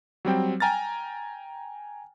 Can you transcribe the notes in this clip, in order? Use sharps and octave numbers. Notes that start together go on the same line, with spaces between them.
F#3 G3 C4 G5
G5 G#5 A#5 F6 A6